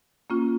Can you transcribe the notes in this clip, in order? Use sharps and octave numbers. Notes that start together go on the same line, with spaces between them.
A#3 C#4 F4